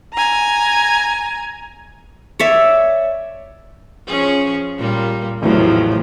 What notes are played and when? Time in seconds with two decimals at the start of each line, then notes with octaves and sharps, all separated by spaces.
0.13 G#5 A#5
2.40 C#5 D5 E5
4.07 F3 C#4 G#4
4.78 A#2 G3 A#3
5.42 A1 E2 A2 C3 F3 F#3